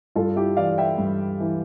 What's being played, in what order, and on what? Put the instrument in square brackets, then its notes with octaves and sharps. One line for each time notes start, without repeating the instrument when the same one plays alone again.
[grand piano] G2 F4 A4
E4 G4
E3 D5 F5
E5 G5
G2
E3